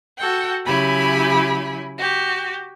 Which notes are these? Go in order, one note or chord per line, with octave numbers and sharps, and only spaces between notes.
F#4 A4 F#5 G5
C#3 F#3 E4 G4 G#5 B5
F#4 G4